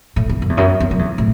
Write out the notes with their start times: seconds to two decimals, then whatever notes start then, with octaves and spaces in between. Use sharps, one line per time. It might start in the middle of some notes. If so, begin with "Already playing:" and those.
0.16 A2
0.29 E2
0.42 F#2
0.49 E2
0.57 F#2
0.80 E2
0.91 F#2
0.99 E2
1.18 A2